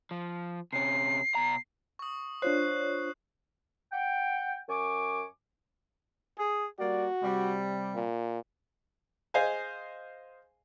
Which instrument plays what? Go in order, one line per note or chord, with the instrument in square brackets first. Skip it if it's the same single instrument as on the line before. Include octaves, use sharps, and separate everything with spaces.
[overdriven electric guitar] F3
[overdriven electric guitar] C3 C#4 [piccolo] C7
[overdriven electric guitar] B2 A#5
[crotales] C#6 D#6
[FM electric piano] D4 F4 C#5 [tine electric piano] C5 [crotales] F#6 C7
[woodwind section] F#5 G5
F#2 G#5 C#6 D6
[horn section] G#4
[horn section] G3 A#3 D5 [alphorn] F#4
[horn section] C3 G3
[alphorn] A#2
[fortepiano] G#4 C5 D#5 F5 G#5